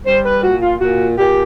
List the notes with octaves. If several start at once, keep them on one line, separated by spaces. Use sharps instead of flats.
G3 C5
B4
A#2 F#4
F4
A#2 F#4
A#2 G4